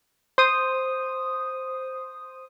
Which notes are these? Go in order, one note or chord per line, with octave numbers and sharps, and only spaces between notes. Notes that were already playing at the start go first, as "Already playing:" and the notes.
C5 D#6